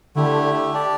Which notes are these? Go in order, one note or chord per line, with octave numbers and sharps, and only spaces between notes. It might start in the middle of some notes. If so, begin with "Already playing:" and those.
D3 A3 E4 G4
D4 G4 D5